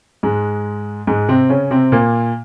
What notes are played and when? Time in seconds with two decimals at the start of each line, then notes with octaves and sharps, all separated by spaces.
0.23 G#2 G#3
1.07 G#2 G#3
1.29 C3 C4
1.49 C#3 C#4
1.71 C3 C4
1.92 A#2 A#3